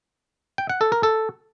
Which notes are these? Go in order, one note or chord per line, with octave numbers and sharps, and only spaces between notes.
G5
F#5
A4
A#4
A4